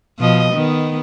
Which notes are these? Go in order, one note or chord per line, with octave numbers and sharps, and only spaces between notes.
B2 F3 D#5
D#3 B3